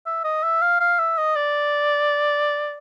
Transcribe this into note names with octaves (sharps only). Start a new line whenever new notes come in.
E5
D#5
E5
F5
F5
E5
D#5
D5